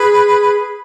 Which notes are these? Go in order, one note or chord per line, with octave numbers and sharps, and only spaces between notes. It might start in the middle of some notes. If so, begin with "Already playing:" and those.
Already playing: G#4 B4